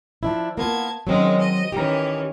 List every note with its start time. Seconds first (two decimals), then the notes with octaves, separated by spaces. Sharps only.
0.23 F3 D4 E4
0.58 A#3 B3 F4 A5 G#6
1.07 D#3 F#3 G#3 C4 C#4
1.40 D#5
1.72 D#3 E3 C#4 G4 A#5